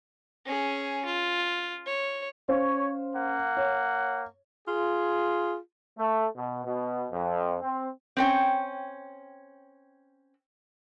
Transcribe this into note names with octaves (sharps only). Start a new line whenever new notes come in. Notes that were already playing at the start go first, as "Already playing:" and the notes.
C#4 G#4
F4
C#5
C#4 C5 C#5 F5
A#3 F#5
C#5
F4 G#4
A3
B2
B2
F2
C4
C4 C#4 G5